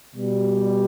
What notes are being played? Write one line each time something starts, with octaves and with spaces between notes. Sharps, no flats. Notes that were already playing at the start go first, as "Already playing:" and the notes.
B2 G3